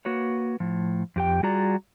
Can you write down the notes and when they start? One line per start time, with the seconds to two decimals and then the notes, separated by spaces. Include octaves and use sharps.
0.05 A#3 F#4 B4 C#5
0.60 A2 F3
1.16 F2 G4 G5
1.43 G3 F4 F#4 G#4 D5 A#5